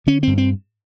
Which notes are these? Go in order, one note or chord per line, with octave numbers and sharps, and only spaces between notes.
D3 C#4
G2 C4
C4